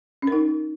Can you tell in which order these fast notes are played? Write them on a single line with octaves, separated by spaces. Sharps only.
C#4 A#4 D#4